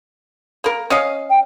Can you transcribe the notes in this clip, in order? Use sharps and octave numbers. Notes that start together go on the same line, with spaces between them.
A#3 A#4
C#4 D#5 F5
G5